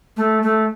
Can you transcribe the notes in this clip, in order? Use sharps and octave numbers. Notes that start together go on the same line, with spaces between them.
A3
A3